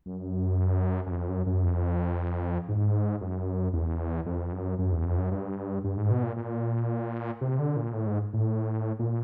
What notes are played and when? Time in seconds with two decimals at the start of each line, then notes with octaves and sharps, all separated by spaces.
0.06 F#2
1.06 F#2
1.11 F2
1.28 F#2
1.46 F#2
1.64 F2
2.69 G#2
3.21 F#2
3.73 E2
4.26 F2
4.52 F#2
4.79 F#2
4.92 E2
5.05 F2
5.17 F#2
5.31 G2
5.84 G2
5.97 G#2
6.11 B2
6.23 A#2
6.36 A#2
7.41 C3
7.59 D3
7.76 A#2
7.94 A2
8.07 G#2
8.33 A2
8.99 A#2